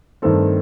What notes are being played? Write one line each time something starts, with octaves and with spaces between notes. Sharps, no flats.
G2 D#3 A3 C4 A4